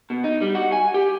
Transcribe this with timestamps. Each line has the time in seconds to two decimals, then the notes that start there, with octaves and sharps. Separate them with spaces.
0.10 B2
0.24 D#4
0.41 G3
0.55 F#4
0.72 G#5
0.94 G4